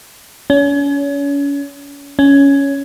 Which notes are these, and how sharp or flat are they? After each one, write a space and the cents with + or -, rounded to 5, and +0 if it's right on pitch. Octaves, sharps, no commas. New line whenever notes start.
C#4 +35
C#4 +10